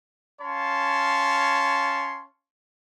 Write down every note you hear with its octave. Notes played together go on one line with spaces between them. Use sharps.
C#4 C#5 F5 A5 C6